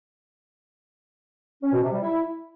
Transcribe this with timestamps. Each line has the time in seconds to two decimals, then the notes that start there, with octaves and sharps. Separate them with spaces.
1.63 C#4
1.73 B2
1.83 C3
1.92 G3
2.02 E4